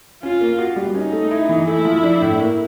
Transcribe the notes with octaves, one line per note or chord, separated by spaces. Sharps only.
C#4 F4
A#3
F#4
G3
C#4 D#4
A3
E4
E3
A3 E4
F3
D4
A2
A#3